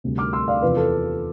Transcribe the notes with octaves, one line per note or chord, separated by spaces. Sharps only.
D2 C3 G3
D6 F6
C6 E6
D5 F5
E2 C3 F3 B4
A4